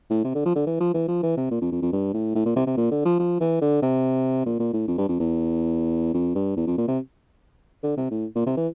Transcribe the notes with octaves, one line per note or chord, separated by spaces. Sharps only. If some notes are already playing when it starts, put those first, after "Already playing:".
A2
C3
D3
F3
D3
E3
F3
E3
F3
E3
C3
A#2
F2
F2
F2
G2
A2
A2
A#2
C3
C3
A#2
D3
F3
F3
E3
D3
C3
A#2
A#2
A2
F2
G2
F2
E2
F2
G2
E2
F2
A#2
C3
D3
C3
A2
A#2
C3
E3